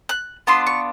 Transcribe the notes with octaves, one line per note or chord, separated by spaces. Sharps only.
F#6
B3 D4 F4 C6
C#6